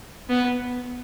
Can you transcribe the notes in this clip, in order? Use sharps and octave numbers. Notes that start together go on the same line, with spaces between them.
B3